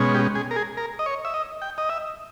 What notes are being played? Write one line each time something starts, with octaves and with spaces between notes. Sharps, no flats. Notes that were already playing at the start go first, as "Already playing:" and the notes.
Already playing: B2 G#3 C#4
G4
G#4
A#4
G#4
A#4
D#5
C#5
E5
D#5
G5
D#5
E5